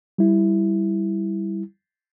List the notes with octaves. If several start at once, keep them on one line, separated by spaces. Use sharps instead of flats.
G3 E4